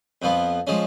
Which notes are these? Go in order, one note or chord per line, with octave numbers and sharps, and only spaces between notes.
F2 F3 B3
F3 G#3 C#4